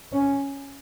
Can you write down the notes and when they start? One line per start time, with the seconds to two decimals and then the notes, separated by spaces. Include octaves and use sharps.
0.12 C#4